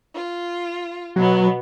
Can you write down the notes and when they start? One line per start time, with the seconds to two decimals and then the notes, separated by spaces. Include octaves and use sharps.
0.14 F4
1.16 B2 F#3 B3